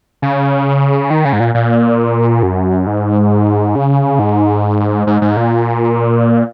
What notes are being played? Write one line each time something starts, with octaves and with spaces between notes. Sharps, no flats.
C#3
D#3
C#3
G#2
A#2
A#2
F#2
G#2
C#3
G#2
G#2
G#2
A#2